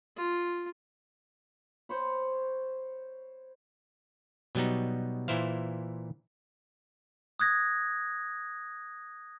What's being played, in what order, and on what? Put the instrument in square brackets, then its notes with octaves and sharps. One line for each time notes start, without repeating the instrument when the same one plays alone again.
[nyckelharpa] F4
[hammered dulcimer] C5 C#5 B5
[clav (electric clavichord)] B2 F#3 G3 B3 D#4
A#2 E3 E4 C5 F5
[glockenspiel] D#6 F#6 G#6 A#6